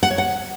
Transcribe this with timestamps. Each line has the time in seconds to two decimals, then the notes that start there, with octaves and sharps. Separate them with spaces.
0.03 F#5
0.10 C#5
0.18 F#5